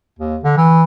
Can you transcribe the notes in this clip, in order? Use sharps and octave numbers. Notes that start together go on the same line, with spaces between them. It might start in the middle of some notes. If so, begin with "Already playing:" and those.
D#2
D3
E3